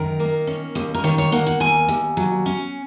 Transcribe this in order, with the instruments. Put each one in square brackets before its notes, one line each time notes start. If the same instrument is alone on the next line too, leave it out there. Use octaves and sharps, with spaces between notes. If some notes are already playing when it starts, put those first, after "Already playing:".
Already playing: [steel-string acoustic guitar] F#2 D#3 A#4
A#3
C#4
D#2
A#4
D#3 C#5
C#5
A#3 F#5
F#5
D#2 G#5
D#2
F#3
C#4